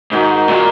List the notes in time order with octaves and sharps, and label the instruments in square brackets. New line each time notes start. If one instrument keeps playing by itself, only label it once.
[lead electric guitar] G#2 [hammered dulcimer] D#3 G#3 F#4
[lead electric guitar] A#2 [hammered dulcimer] D#3 G#3 F#4